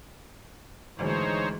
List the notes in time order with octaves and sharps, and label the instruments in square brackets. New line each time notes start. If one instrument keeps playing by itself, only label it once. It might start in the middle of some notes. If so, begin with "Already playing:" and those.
[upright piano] G#1 D2 D3 [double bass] E3 G#3 [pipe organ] D#4 C5 C#5